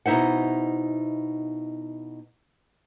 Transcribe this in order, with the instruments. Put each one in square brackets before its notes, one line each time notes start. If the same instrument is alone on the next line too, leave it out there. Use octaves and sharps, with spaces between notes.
[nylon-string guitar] B2 D#4 E4 C5 F#5